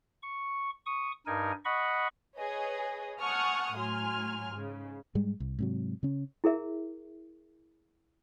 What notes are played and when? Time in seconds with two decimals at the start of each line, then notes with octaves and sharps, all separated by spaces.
0.23 C#6
0.86 C#6 D#6
1.26 G2 D#4 A#4 G#5
1.65 D#5 F#5 B5 C#6
2.37 G#4 B4 C#5 D#5
3.21 F#5 G#5 A5 C#6 D#6 F6
3.75 A2 F#3 G#5 C6 F6
4.52 G#2 C#3
5.15 G#2 G3 G#3
5.40 C2
5.59 G#2 C3 F#3
6.03 C#3 C#4
6.44 E4 G#4 A#4 E5